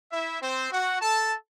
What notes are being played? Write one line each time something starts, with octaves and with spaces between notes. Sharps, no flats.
E4 E5
C4 C5
F#4 F#5
A4 A5